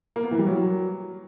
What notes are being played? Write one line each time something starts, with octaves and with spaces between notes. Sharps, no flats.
A#3
B3
E3
G3
F#3